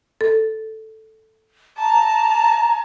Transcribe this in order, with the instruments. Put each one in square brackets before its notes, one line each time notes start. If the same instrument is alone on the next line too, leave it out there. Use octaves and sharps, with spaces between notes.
[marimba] A4
[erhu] A5 [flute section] A#5